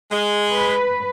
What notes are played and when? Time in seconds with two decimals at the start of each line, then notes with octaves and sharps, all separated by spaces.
0.11 G#3
0.51 B4